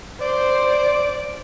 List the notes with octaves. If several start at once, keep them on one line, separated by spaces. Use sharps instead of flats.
C5 D5